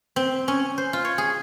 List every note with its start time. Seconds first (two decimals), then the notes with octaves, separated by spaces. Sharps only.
0.16 C4
0.48 C#4
0.78 C5
0.93 F4
1.05 C#5
1.18 G#4